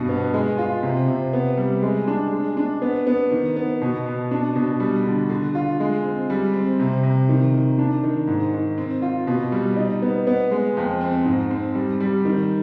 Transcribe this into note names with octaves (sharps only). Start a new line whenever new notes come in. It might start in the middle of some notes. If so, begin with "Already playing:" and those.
Already playing: G2 B2
B3
G#3
F4
C3
C3
B3
G3
G#3
D4
G#3
D4
B3
B3
D#3
B3
B2
B2
D4
B2
G3
D3
D3
F4
G#3
C4
G3
C4
C3
C3
D#3
D#3
D4
D#3
G#2
D#3
C4
F4
B2
G3
D#4
B3
B3
G#3
F2
C4
G#2
C4
G3
G3
D#3